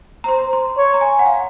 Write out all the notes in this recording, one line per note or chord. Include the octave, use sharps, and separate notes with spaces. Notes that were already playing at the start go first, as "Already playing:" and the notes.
A#5
C5 C6
C6
C#5
A#5
G#5
F#5
F5